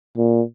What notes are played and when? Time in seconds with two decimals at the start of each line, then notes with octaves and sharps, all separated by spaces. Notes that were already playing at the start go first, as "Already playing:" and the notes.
0.17 A#2